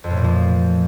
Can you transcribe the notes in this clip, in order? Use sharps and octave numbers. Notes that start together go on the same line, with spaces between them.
F2
A2
A#2
F3